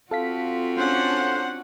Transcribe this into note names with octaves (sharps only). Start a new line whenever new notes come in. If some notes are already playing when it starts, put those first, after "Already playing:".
C4 F4 F#4 A4 F5 B6
C#4 D4 C5 F#5